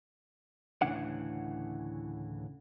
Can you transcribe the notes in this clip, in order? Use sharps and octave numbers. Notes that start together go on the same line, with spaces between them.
D2 A2 C#3 E3 D4 F#5